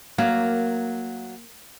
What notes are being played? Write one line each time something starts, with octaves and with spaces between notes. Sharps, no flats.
F#3 A#3 F5